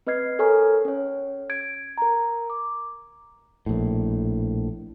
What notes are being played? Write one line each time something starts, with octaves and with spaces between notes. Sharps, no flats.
C4 B4 D#5 F6 G#6 C7
A4 A#4 C#5 G#5 C#6 F6
C#4 C#5
G#6 D7
A#4 A#5
D6
A#1 A2